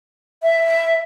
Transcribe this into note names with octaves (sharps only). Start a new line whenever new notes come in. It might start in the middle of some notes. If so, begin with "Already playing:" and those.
E5